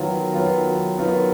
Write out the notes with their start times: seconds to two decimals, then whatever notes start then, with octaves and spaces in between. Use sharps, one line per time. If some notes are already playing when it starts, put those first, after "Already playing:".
Already playing: D#3 F#3 B3 F4
0.34 D#3 F#3 B3 F4
0.98 D#3 F#3 B3 F4